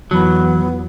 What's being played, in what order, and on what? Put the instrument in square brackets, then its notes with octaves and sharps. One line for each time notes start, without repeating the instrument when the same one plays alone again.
[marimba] F2 E4 B5 [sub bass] E3 [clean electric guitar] F#3 [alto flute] B3